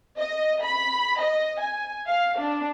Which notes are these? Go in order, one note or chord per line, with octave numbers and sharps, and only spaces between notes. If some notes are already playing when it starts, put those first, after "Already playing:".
D#5
B5
D#5
G#5
F5
D4